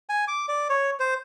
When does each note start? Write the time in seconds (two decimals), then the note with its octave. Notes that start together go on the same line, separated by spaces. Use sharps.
0.09 G#5
0.28 D6
0.48 D5
0.70 C#5
1.00 C5